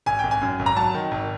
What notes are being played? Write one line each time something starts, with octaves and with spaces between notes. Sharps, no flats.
G#1 G#5
G#1 G5
G#5
F#2
G#1
A#5
F#3 A5
D#3
G#1